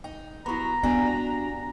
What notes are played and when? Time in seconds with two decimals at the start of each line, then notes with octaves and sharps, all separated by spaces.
0.04 D#4 G5
0.46 F#3 B3 E4 G4 A#5 B5
0.83 B3 D4 F#4 G4 D5 G#5 A5